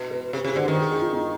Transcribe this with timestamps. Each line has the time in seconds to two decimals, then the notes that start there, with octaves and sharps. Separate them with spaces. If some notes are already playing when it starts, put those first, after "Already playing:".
Already playing: B2
0.11 B4
0.33 C3 G4
0.45 C3 G#4
0.56 D3 C5
0.68 D#3 B4
0.79 G#4
0.90 G#4
1.02 F4
1.13 D#4